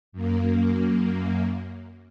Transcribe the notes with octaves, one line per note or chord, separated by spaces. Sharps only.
F#2 A#3